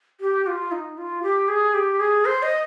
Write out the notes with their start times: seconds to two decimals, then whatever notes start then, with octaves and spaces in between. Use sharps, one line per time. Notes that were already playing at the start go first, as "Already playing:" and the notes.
0.21 G4
0.47 F4
0.72 D#4
0.98 F4
1.23 G4
1.48 G#4
1.74 G4
2.00 G#4
2.25 C5
2.42 D#5